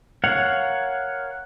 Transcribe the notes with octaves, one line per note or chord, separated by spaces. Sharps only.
A#4 C#5 F5 F#5